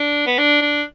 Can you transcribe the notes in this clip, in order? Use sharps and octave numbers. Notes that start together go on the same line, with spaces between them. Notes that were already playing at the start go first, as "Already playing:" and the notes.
Already playing: D4
B3
D4
D4